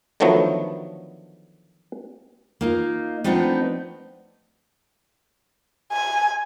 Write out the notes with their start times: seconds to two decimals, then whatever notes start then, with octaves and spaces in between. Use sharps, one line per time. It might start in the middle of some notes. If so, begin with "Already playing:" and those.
0.20 D3 D#3 F3 F#3 A3 B3
2.61 A#3 D#4 F4
3.24 F3 A3 B3 C4 D4 D#4
5.93 G#5